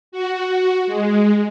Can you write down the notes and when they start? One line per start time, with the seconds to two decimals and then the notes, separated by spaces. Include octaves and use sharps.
0.12 F#4
0.87 G#3